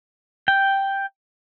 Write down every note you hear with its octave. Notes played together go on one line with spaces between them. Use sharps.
G5